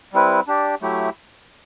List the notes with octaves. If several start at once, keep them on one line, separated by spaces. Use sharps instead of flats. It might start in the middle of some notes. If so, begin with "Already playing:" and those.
G3 C4 E4 B4
D4 G4 D5
F#3 A3 E4 G4